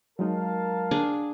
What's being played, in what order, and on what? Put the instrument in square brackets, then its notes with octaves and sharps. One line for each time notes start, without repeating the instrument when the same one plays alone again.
[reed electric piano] F#3 G#3 D#4 [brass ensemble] A#4 F5 A5
[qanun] D4 G#4